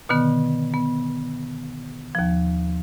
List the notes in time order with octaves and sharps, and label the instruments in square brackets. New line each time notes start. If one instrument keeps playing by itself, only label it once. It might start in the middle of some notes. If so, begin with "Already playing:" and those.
[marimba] B2 D3 D#3 B3
B3
D#2 F3